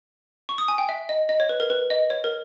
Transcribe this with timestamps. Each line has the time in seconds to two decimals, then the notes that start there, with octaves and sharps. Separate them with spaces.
0.49 C#6
0.58 D#6
0.68 G#5
0.78 G5
0.89 E5
1.09 D#5
1.29 D#5
1.40 C#5
1.49 B4
1.60 A#4
1.70 B4
1.90 D#5
2.10 C#5
2.24 A#4